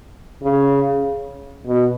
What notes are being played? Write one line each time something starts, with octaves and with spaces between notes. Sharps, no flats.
C#3
B2